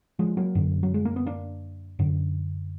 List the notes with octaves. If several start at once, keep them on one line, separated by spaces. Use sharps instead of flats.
F3 G#3
F#3 A#3
F#2 D3
F#3
G#3
A#3
B3
A#3 D4
F#2 D3